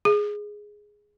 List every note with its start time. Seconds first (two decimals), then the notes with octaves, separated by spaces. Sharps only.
0.05 G#4